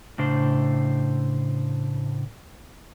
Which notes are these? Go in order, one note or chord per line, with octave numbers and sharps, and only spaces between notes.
A2 C#3 D4 C5